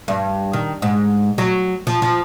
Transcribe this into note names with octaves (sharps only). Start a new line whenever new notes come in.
G2
D#3
G#2
F#3
F3
F3